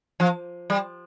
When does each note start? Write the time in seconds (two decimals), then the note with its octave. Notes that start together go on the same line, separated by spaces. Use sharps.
0.20 F3
0.70 G3